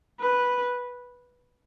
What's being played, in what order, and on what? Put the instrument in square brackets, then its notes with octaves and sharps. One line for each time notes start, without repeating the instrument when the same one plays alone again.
[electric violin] B4